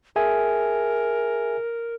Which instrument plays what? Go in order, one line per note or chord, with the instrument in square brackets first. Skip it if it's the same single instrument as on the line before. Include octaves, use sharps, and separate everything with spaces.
[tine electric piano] G#4 E5 G#5 [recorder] A#4